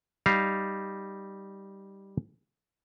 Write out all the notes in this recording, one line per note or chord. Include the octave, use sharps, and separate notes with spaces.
G3 D#4 F5